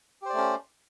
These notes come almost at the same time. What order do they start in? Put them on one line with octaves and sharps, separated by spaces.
G4 C5 D5 A3 C#4